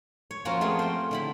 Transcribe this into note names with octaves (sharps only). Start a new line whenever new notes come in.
C#5
F3 A#3 C#4 F4 F#4
A3 B3 C4 F4 G#4
C5 G5
D3 E4 B5